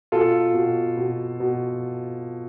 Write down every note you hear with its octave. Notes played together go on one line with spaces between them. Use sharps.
B2 F4 A4
B2
B2
B2